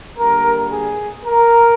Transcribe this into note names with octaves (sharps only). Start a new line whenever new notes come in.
D3 G3 A#3 A#4
G#4
A#4